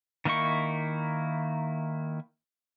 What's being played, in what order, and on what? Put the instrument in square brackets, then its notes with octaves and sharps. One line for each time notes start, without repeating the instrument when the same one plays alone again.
[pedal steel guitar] D#3 A#3 D#4 E4 C#6